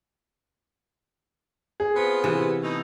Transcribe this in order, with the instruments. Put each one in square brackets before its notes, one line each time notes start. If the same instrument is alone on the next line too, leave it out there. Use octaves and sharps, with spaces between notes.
[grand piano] G#4
[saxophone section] B3 C4 F4
[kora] C3 E3
[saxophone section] B2 A3 D#4